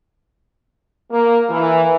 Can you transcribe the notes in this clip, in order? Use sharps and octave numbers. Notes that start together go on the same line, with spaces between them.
A#3
E3